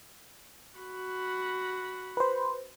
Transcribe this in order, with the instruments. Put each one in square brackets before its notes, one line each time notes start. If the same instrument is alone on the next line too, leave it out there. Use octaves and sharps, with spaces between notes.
[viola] F#4 B5
[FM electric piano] B4 C5